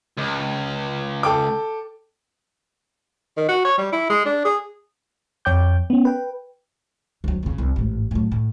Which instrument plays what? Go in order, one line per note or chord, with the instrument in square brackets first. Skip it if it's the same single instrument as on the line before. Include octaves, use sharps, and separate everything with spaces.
[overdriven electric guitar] C#2
[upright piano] A4 G5 D6
[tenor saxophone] D#3
F#4
C#5
G3
E4
G#3
D4
G#4
[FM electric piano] F2 C#5 G5 D6 G6
B3 C#4
B4 G5
[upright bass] D2 F#3
F1 C#3
C2
A1 G#2
A2 F#3
A2